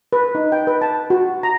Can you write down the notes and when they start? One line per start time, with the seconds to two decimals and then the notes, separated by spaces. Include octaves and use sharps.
0.13 B4
0.35 D#4
0.52 G5
0.67 B4
0.81 A5
1.10 F#4
1.43 A#5